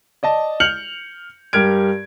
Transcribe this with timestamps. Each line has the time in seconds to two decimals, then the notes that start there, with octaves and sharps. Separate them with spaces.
0.23 D5 D#5 A5
0.60 F6 G6 C#7 F7 F#7
1.53 G2 G4 A#4 F6 G#6 D7